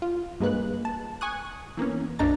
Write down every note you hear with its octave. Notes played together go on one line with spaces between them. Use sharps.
F4
G2 G#3 A#3 B4 F#6
A5
G#5 C#6 D#6 F#6
E3 A#3 B3 C#4
B1 F#2 D4 D#4 A#5 A6